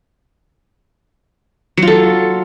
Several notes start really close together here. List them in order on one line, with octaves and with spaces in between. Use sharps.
F#3 F4 A4